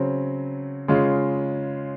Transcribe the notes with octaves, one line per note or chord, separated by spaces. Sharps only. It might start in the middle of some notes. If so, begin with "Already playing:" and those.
Already playing: C#3 F#3 C4
C#3 G#3 C#4 F4